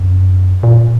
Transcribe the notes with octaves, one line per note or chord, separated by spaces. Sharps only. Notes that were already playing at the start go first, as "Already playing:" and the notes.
Already playing: F#2
A#2